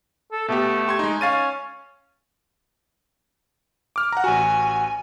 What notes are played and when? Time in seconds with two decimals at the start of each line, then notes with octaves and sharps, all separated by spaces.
0.32 A4
0.48 B2 A3 B3 G4
0.87 G4 C6 G#6
0.99 G#3 D#4
1.21 C#4 F5 A6 D#7
3.96 D6 F6
4.12 F#5 A#5
4.24 A1 F#4 G#5